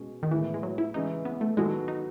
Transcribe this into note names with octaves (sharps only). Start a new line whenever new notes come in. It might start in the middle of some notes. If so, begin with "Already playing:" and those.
Already playing: B2 G#3 C#4
D#3
A2 E3 G#3 B3 E4 G#4
G#3
F#3
E4
C#3 E3 G#3 C#4 D#4
B3
A3
D#3 F#3 G#3 B3 F#4 A4
D#4